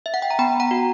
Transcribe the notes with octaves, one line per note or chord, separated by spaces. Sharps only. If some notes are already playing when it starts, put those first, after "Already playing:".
E5
F#5
G5
A#5
B3 G5 B5
F#5 A#5
F#4